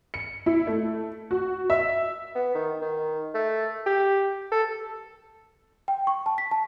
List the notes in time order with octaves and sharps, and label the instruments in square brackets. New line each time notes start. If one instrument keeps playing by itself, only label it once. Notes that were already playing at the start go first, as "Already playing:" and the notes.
[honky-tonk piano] C#7
E4
A3
F#4
E5
[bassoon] B3
D#3
D#3
A3
G4
A4
[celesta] G5
C#6
A5
B6
A5